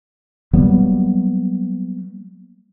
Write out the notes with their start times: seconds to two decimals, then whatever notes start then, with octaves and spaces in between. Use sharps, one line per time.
0.53 F#3 G3 A#3 B3